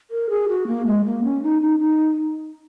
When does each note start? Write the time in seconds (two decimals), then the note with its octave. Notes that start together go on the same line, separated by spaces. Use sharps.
0.11 A#4
0.30 G#4
0.49 F#4
0.67 A#3
0.86 G#3
1.05 A#3
1.24 C#4
1.43 D#4
1.62 D#4
1.79 D#4